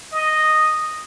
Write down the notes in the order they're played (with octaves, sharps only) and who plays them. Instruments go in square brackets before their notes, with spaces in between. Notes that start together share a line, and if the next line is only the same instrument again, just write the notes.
[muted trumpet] D#5